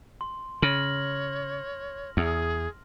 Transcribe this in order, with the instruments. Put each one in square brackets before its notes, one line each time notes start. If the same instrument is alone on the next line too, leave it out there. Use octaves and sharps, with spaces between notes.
[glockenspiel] C6
[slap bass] C#3 [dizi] C#5 [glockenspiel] F6 A#6 F#7
[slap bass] E2 [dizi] G#4